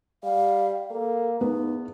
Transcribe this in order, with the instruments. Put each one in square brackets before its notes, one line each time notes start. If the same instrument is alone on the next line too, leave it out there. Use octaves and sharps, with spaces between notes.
[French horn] G3 [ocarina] F5
[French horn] A#3 [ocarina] A4
[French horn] E2 [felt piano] B3 [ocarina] D#4